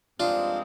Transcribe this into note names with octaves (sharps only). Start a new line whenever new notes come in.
G2 F3 G#3 C4 D4 D#4 F4